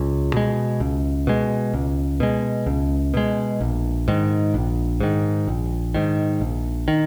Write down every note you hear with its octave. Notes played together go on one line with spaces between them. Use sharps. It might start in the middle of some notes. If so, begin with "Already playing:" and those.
Already playing: C#2
B2 G#3
C#2
B2 G#3
C#2
B2 G#3
C#2
B2 G#3
A#1
G#2 D#3
A#1
G#2 D#3
A#1
G#2 D#3
A#1
D#3